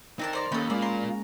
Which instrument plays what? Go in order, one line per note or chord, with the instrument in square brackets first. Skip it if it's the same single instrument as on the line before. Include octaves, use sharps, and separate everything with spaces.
[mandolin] C4 D4 A5 [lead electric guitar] D#4 A#4
[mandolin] C5 D5 A#5
[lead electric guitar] D#2 [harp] A#3 C#4 B5 [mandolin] D#4 A4
[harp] G#3 [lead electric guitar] A#3 F4 [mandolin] D5
[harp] A#5 [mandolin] C6